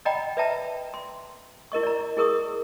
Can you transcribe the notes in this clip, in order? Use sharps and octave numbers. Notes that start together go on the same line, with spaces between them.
D5 D#5 F#5 G5 A#5 B5
B4 D5 E5 G5 A5 A#5
C6
E4 A#4 D#5 C#6
D5 A#5
E4 G#4 A#4 C#6 D#6